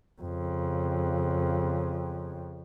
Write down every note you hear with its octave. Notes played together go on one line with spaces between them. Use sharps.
F2 C#3